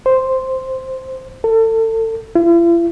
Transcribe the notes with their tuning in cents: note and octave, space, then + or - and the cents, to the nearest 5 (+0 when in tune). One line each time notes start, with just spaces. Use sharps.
C5 +0
A4 +30
E4 +45